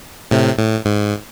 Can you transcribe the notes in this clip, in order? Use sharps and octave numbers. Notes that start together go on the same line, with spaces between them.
A2 C3
A2
G#2